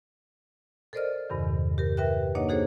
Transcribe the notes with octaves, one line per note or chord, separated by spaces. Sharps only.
A4 A#4 C5 D5 D#5 F6
E2 G2 C3 D#3
G4 A#4
G4 A#4 B4 E5 G5 F#6
A#3 D4 D#4 C#5 D#5 F#5
D#4 F#4 G#4 A4 C5 C#5